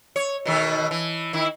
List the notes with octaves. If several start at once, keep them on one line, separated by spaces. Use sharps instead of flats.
C#5
B2 D#3 A3
E3
D#3 E4